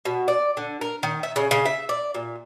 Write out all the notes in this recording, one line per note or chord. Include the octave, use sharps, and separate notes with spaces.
B2
D5
D3
A#4
D#3
E5
C#3
C#3
E5
D5
A#2